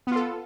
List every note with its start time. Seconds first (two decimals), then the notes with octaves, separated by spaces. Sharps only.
0.07 B3
0.11 F4
0.16 A4